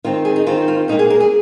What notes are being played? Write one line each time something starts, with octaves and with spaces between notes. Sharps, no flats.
D#3 C4 F4
G#4
D#4
D#3 C4 F4
F4
A#2 A#3 D#4
G#4
A#4
G#4